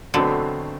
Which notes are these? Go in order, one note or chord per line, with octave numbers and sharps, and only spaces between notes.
B2 D3 F#3 A3 C4